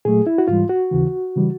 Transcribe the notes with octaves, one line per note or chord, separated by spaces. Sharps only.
A#2 F#3 A3 G#4
E4
F#4
G#2 E3 G3 F4
F#4
D#2 C#3 E3
C#3 E3 G3